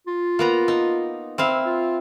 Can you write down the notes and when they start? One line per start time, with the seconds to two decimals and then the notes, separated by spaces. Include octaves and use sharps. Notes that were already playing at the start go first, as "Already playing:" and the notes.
0.07 F4
0.39 A#3 B3 A#5
0.68 D#4
1.38 C4 E4 F5
1.66 F4